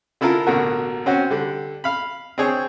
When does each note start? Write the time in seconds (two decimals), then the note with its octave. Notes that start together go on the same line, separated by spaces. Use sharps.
0.21 D3 E4 F4 A4 A#4
0.47 A1 B2 D3 A#3 F#4 A#4
1.06 C4 C#4 F#4
1.31 D3 G3
1.84 F5 B5
2.38 C4 D4 G#4 C#5